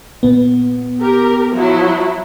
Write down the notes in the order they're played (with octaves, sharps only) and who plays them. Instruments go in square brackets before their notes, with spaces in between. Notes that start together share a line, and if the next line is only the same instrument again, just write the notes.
[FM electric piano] A#2 B3
[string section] G4 A#4
F3 F#3 E4